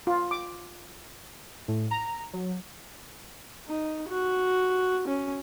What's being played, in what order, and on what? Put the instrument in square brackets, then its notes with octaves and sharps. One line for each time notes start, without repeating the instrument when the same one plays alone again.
[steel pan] F4
D6
[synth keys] A2
A#5
F#3
[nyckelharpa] D#4
F#4
C#4